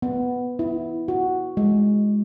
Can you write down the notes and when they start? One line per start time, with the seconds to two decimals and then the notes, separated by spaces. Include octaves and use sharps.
0.02 B3
0.59 E4
1.08 F#4
1.57 G#3